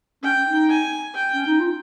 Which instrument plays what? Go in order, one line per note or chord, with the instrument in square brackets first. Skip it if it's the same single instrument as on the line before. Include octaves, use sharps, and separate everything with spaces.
[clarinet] C#4 [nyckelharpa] G5
[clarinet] D#4
[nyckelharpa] G#5
G5
[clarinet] C#4
D#4
F4